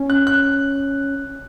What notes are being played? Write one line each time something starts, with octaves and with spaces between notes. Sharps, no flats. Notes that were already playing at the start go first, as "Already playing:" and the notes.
Already playing: C#4
F#6
F#6